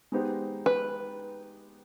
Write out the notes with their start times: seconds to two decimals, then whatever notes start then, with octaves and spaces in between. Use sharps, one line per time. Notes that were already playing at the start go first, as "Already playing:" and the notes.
0.12 G#3 B3 D#4 G4 C5
0.66 B4